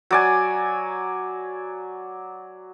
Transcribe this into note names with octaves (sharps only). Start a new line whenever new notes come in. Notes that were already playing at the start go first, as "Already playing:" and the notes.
F#3 D5 G#5